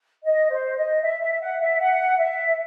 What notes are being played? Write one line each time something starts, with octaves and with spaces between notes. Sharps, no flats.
D#5
C5
D#5
E5
E5
F#5
E5
F#5
E5